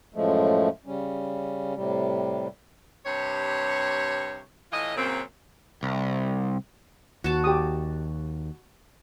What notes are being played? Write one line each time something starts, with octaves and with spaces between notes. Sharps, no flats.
F#2 A2 F3 G#3 A3
C#3 G3 C#4
A2 C3 G3
G2 C3 C#5
A2 E3 F4 D#5
F#2 A#2 C#3 C4
C2
D#2 F#4 A5
G4 D#6